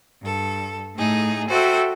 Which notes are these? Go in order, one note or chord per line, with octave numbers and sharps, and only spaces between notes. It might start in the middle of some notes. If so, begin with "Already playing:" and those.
G2 A4
A2 A3 D#4 G#4
F#4 A4 C5 E5 G5